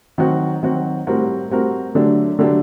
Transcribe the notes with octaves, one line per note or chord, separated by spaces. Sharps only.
D#3 F#3 C4 F#4
D#3 F#3 C4 F#4
A2 G3 C4 F#4 A#4
A2 G3 C4 F#4 A#4
D3 F#3 A3 D4 G4
D3 F#3 A3 D4 G4